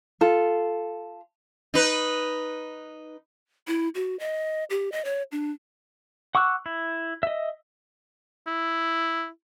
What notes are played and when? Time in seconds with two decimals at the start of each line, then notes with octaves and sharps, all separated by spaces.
0.21 F4 A4
1.74 D#4 B4
3.67 E4
3.95 F#4
4.19 D#5
4.70 G4
4.92 D#5
5.05 C#5
5.32 D4
6.35 F#5 C#6 D6 E6 F#6
6.66 E4
7.23 D#5 E5
8.47 E4